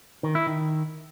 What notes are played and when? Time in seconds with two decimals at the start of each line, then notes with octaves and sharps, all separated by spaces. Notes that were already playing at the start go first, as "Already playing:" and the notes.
0.23 D#3
0.35 E4
0.47 D#3